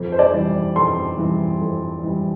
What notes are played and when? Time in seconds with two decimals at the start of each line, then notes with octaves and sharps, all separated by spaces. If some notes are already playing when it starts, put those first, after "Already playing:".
Already playing: F2
0.12 C5
0.19 D5
0.33 E3 G3
0.76 F2 C6
1.18 E3 G3
1.61 F2
2.03 E3 G3